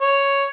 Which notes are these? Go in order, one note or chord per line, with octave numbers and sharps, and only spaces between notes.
C#5